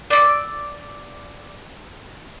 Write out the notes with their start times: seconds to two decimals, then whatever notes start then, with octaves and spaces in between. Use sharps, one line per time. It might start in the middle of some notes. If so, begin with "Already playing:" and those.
0.10 D5 E6